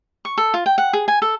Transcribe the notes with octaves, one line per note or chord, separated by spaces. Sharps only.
C#6
A4
F4
G5
F#5
G#4
G#5
A4